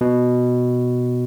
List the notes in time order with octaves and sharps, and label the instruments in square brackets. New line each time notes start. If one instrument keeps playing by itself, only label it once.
[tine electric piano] B2